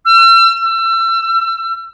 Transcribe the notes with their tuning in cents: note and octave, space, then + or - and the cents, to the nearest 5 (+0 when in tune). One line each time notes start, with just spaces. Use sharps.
E6 +45
E6 +35